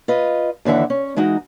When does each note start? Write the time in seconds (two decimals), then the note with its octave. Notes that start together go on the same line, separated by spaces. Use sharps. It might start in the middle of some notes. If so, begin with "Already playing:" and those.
0.08 F4 B4 D#5
0.65 D#2 D3 E3 E5 F#5
0.90 C#4
1.16 E3 G#3 D#4 F#4